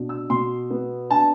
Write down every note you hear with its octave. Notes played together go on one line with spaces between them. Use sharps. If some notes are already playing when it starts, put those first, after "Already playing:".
Already playing: B2 D4
E6
B2 C6
B3
D4 A5